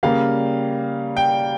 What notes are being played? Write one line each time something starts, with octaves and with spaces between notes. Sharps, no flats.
C#3 G3 A#3 F5
G5